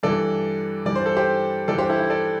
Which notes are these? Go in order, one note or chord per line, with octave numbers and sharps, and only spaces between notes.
G2 E3 G3 A4 D5
G2 E3 G3 D5
C5
A4
G4 C5
G2 E3 G3 A4 D5
G4 C5
E4 A4
E4
A4 D5